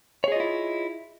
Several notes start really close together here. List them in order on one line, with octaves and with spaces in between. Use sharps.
C#5 G#4 D#5 F4 E4